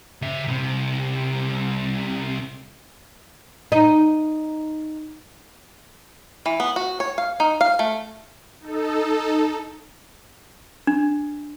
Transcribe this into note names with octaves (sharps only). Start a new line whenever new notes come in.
C#3 E5
C2 C3
D#4
E3
B3
F#4
C#5
F5
D#4
F5
A3
D#4 A4
D4